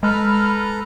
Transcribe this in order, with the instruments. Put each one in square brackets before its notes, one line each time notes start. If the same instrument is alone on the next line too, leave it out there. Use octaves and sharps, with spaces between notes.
[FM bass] G#3 [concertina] A4 B4 A#5 [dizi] B5 [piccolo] F6